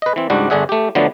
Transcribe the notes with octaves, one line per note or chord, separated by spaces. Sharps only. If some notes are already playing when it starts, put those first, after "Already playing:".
B4 D#5
E3 C4
C#2 G#2 G3 D4 F#4
G1 D3 D4 G#4 E5 F#5
A3 G4
D3 F3 F#3 A3 B3 D4